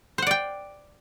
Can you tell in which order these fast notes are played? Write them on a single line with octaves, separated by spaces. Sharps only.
C5 F#5 D5 G5